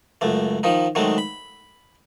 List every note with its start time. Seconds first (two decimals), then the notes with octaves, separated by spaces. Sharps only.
0.21 C#2 F#2 A3
0.63 D#3 F3 D#4
0.95 D#3 F#3 G#3 A3 C4
1.18 B5